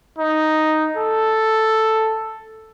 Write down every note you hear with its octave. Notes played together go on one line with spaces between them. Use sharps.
D#4
A4